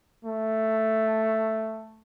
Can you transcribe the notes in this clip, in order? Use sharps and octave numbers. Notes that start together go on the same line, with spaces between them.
A3